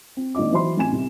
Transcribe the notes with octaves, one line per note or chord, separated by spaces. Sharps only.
C4
G#1 A#3 D4 D#5 D6
E3 F#3 C5 B5 C6
A1 C4 G#5 E7
C2 C3